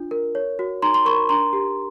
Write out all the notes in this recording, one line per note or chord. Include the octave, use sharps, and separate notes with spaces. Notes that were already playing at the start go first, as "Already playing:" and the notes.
Already playing: D4 F4
A#4
C#5
F#4
D#4 A#5 C6
C6
A#4 B5 C#6
D4 A#5 C6
G4